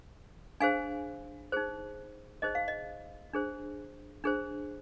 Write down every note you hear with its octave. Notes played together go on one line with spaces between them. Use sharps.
D4 G#4 C5 F5 G#5
D#4 G#4 C5
D#4 G#4 C5 D#5
F5
D#5
D4 G#4 C5
D4 G#4 C5